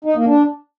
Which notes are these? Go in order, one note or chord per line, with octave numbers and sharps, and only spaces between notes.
D#4
A#3
D4